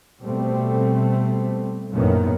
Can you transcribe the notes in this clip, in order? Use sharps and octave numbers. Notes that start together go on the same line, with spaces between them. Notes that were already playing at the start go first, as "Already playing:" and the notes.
B2 G3 A3 C4
A#1 F#2 A2 D#3 A#3 B3